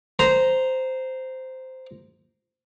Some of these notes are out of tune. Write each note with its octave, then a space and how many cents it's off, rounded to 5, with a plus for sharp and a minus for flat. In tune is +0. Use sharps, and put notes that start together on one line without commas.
C5 -10 A#5 +0